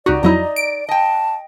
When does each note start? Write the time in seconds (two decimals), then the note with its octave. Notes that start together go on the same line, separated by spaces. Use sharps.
0.06 C#2 D#4 F#4 G4 D5
0.23 F2 F#3 D#4 E4 D#5 A#5
0.56 D7
0.89 D#5 G5 A5